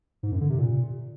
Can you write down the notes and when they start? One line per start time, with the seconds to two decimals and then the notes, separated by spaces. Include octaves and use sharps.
0.23 G#2
0.32 F#2
0.41 D3
0.50 C3
0.59 A#2